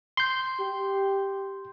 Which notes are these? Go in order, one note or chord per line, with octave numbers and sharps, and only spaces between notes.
C6 G6
G4